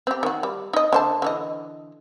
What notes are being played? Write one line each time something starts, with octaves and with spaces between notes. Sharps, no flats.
C4 G4
D#3 F#4
G3
D#4 D#5
D3 C5 A5
D3 E3 D#5